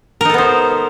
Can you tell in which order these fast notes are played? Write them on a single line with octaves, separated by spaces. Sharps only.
A#4 D#4 A4 B3 C5